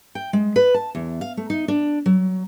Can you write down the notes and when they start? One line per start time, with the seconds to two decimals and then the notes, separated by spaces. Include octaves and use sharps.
0.15 G5
0.33 G#3
0.56 B4
0.74 A5
0.95 E2
1.21 F5
1.37 A3
1.50 D#4
1.68 D4
2.06 F#3